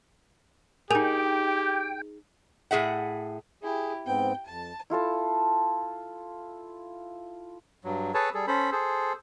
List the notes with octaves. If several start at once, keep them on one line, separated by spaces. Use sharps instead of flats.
D#4 G4 G#4 A#4 G5 G#5 F7
A2 G#4 E5 F#5
E4 G4 G#4
G#2 B3 C4 G5
F2 A5
E4 F4 A4 A5
G2 F#3
G#4 A4 B4 C#5 A5
G3 G#4 A4
C#4 A4 C5 B5
G#4 A4 C5